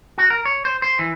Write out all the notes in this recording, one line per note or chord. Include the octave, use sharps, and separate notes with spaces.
F#4
A#4
C#5
C5
C5
E3